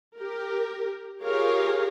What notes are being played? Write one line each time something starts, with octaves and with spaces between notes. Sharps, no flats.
G4 A#4
F4 G4 G#4 A#4 C#5 F5